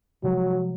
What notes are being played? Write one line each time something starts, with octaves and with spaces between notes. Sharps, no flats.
C3 F3 F#3 G#3